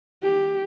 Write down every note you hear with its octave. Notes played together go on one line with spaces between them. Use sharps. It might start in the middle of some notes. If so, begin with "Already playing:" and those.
G4